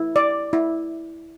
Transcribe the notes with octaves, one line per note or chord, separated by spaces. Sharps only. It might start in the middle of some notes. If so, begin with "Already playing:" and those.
Already playing: E4
D5
E4